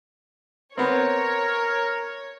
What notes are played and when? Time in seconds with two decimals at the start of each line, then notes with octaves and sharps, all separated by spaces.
0.78 B3 C4 A#4 C#5